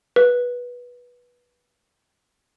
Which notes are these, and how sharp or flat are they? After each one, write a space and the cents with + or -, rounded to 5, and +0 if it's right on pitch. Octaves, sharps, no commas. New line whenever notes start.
B4 -15